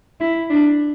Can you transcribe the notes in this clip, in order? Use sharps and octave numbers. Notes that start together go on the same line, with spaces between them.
E4
D4